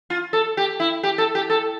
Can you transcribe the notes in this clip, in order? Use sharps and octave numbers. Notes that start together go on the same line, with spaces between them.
F4
A4
G4
E4
G4
A4
G4
A4